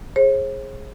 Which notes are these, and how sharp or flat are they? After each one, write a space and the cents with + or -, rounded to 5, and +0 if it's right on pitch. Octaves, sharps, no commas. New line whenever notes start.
G#4 +0 C5 +45